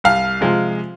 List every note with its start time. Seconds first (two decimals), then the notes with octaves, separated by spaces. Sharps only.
0.04 C2 F5
0.41 C3 F3 G#3